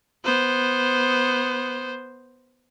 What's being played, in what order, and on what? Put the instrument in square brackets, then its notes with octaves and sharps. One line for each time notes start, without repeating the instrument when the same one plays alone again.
[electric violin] B3 C5